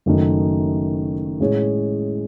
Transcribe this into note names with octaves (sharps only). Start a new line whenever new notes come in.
F#1 F#2 D#3 A3 D#4
A2 G#3 C#4 G#4 C#5